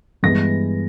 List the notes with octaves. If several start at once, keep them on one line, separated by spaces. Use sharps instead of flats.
G2 E3 G#3 B3 A#6